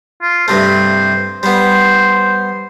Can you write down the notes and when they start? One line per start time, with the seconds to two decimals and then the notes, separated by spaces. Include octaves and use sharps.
0.22 F4
0.48 G2 C3 A3 C5
1.43 G3 B3 C5